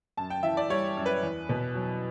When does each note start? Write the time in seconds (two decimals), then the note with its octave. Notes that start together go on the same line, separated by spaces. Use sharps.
0.17 F#2 A5
0.30 G5
0.43 E3 E5
0.57 D5
0.70 G3 C#5
0.97 F#2
1.06 B4
1.23 E2
1.49 B2
1.75 F#3